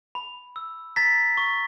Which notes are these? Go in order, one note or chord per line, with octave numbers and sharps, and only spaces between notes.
B5
E6
A#5 A6 B6
C#6